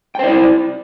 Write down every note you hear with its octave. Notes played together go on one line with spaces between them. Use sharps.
E4 C5 D5 G5